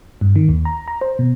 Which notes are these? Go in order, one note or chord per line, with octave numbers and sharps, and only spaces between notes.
G2
D#3
D#2
A#5
A#5
C5
B2